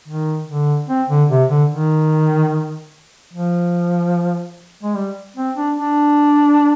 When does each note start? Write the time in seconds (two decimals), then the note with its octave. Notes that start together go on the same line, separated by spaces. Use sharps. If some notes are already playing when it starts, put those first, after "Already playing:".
0.08 D#3
0.47 D3
0.89 C4
1.09 D3
1.30 C3
1.50 D3
1.70 D#3
3.33 F3
4.83 G#3
4.96 G3
5.37 C4
5.56 D4
5.77 D4